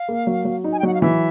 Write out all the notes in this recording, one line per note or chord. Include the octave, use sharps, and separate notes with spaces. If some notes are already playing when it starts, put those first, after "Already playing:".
Already playing: F5
A#3
F#3
F#3
D#4
G#5
G5
F#3 F#5
F5
E3 E5